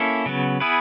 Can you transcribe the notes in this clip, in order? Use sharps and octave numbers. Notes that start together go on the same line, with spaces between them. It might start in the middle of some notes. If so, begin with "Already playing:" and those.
Already playing: A#3 C#4 E4 A4
C#3 F#3 B3
B3 E4 G#4 B4